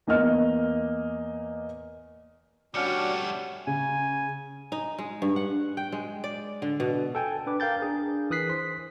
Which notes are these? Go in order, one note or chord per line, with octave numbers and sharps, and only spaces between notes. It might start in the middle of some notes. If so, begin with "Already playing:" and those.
E2 A#3 D#5 F6
G3 A3 C#4 D4 F#4 D5 F6 C#7
C#3 G#5
D#4
G#3
G2
F#5
G5
G#3
D5
D3
B2
A4 G5 G#5
D4 B4 D6
A#4 F5 G5 G6 A6
D4 G#4 A#4
E3 D#6 F#6 B6 C7
C5 C6 B6